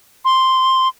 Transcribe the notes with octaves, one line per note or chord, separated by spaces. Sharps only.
C6